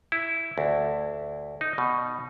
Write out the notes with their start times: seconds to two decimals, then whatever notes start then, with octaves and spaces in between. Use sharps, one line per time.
0.12 E4
0.58 D2
1.61 D#4
1.78 B2